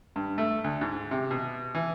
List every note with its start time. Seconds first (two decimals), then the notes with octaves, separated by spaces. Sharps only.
0.16 G2
0.38 A3
0.64 D2
0.81 G#2
1.11 C3
1.31 B2
1.75 E3